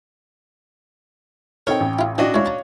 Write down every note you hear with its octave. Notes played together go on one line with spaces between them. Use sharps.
C4 D#4 A4 A#4 C#5 G5
A1
E4 F4
E3 D4 F#4 D#5
G#3 E4 C#5 F5
A5 A#5